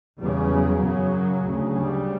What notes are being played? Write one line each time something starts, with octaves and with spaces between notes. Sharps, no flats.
E2 C#3 G3
F#3
F#2 C#3
D2 C#3
G3